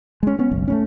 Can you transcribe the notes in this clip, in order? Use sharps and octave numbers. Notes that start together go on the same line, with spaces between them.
G#3 C#4
B3 C#4
F#1 B1
A3 B3 C#4